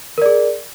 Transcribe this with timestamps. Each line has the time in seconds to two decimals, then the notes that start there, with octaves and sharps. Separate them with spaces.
0.18 A#4
0.22 D5
0.26 G#4